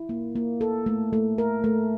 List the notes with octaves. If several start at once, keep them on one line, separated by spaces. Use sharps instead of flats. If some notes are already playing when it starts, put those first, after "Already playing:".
Already playing: E4
A#3
A#3
A4
A3
A3
A#4
A3